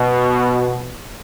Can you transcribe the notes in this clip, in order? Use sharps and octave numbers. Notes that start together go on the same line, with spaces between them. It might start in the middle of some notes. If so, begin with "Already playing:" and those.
Already playing: B2